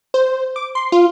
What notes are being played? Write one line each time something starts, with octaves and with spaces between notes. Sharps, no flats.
C5
D6
C6
F4